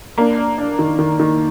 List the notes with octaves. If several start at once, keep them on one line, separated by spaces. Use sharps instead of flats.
A#3 D4
D4
D4
D#3
D#3
D#3